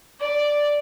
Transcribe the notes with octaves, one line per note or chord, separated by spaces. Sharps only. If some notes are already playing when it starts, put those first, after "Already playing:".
D5